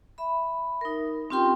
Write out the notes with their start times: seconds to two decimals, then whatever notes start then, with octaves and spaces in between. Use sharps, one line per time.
0.18 E5 B5
0.81 D#4 A#4
1.30 C4 C#4 F4 G4 G5 C6